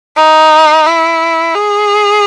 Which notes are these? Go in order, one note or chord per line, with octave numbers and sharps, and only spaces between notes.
D#4
E4
G#4